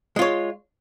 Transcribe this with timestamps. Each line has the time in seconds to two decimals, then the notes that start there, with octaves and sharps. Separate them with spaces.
0.16 G#3
0.19 F4
0.22 C#5